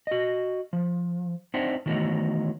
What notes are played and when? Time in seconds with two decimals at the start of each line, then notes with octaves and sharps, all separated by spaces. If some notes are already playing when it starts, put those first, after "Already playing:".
0.07 F#4 D#5
0.73 F3
1.54 C4 D4 D#4 C5 E5 F#5
1.86 D#3 E3 F#3 A3 B3 D#4